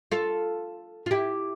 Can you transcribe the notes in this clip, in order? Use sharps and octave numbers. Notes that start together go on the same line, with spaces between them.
F4 A4
F4
E4 G4